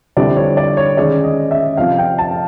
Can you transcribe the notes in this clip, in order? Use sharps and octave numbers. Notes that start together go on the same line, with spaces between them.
F2 D3 G3 C4 E4 D5
C#5
D5
C#5
D#3 G#3 C#4 D5
D#5
E5
F2 C3 F3 F5
G5
A5